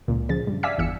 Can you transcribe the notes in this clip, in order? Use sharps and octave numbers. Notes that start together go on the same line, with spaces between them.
C#2 A#2
C#3 F3 A6
G2
D5 E5 F5 G#5 E6 B6
G1 E2 E6 C#7